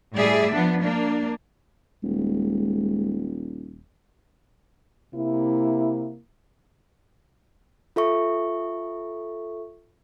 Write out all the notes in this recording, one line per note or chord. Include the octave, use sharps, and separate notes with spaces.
A2 G3 G#4 D5 E5
F3 B3 D4
A#3 D4
D#1 G#3
C3 A#3 E4
F4 A4 E5 C#6